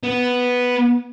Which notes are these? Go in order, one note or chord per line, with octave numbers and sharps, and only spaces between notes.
B3